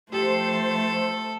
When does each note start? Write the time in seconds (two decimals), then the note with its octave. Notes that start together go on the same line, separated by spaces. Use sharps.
0.12 F3 A3 G4 A4 C5